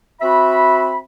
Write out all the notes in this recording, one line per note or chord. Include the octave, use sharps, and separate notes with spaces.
C4 F#4 E5 B5